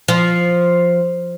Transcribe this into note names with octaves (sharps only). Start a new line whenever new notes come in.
F3